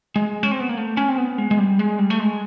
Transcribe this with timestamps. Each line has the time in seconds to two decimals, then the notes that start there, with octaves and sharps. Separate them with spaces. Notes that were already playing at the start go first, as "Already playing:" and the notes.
0.16 G#3
0.43 C#4
0.51 C4
0.60 B3
0.69 A#3
0.77 A3
0.97 C#4
1.09 C4
1.18 B3
1.38 G#3
1.51 G#3
1.59 G3
1.79 G#3
1.99 G3
2.10 A3
2.20 G#3